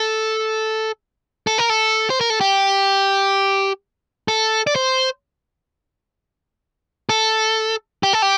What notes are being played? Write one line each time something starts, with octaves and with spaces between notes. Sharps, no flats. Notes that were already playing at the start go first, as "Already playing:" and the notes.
Already playing: A4
A4
A#4
A4
C5
A#4
A4
G4
A4
D5
C5
A4
G4
A4
G4